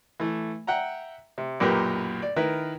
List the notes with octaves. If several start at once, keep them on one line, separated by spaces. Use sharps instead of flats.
E3 A3
E5 F#5 G5 A#5
C3
B1 F#2 A#2 G4 A#4 B4
D5
D#3 E4 A#4 B4